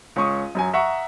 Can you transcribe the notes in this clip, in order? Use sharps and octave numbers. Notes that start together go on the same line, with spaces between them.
C#2 C#4 C#6 D#6
F#2 F#3 G#5
E5 F#5 A#5 C#6